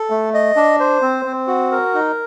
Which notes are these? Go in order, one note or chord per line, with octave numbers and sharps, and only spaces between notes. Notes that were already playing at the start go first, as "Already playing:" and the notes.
Already playing: A4
A3
D#5
D4
C5
C4
C4
F#4
A#4
D#4